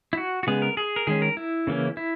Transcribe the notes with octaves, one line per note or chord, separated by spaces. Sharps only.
E4
F#4
F#4
C#3 G#3 B3 G#4
A#4
G#4
A#4
D#3 G#3 C#4 G#4
A#4
E4
C#3 E3 A#3 C#4
E4